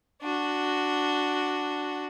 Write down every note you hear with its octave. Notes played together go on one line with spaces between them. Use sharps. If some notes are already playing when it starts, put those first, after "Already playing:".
D4 F#4